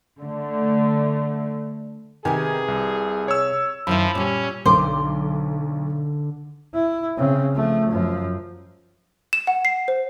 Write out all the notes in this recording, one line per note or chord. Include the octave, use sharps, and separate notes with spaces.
D3 A3
C3 D#3 G#4 B4 G#5
C2
C#5 E6
F#2 D#3 F3 E4 B5
A#2 G3 C#4
B1 D3 C5 D6
E4
C#3 C4
F3 A3
F#2 F3
E7
F#5
C7
C5